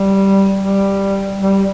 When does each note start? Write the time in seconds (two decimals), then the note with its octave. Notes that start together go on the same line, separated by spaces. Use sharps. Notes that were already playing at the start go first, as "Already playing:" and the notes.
Already playing: G3
0.60 G3
1.40 G3